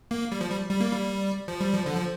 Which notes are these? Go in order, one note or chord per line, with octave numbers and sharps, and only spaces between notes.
A#3
G3
F3
G3
G3
A#3
G3
F3
G3
F3
D3
F3